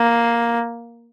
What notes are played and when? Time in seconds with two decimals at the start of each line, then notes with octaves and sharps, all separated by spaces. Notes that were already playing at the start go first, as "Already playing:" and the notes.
Already playing: A#3